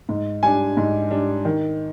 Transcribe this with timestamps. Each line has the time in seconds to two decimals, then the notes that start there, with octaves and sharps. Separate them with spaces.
0.09 G#2
0.43 G3 D4 G#5
0.77 G#2
1.10 G3 D4
1.45 D#3